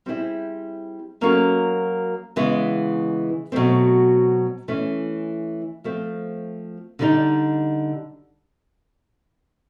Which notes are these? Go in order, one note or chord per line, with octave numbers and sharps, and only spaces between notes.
G3 C4 E4 G#4
F#3 A#3 C#4 F#4 A4
C#3 E3 G#3 B3
B2 F#3 A3 C4
E3 A3 C#4
F3 A3 C4
D3 G3 B3 D#4